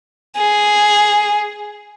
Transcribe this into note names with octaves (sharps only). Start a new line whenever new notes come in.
G#4